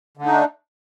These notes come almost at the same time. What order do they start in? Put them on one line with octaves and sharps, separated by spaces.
D3 A3 D#4 D4